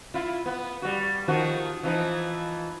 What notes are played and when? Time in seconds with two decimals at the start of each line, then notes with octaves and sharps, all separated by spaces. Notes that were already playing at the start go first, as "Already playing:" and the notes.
0.14 E4 F4
0.46 B3
0.82 G3 F#4
1.28 D#3 F3 F#4
1.83 E3 F3 D#4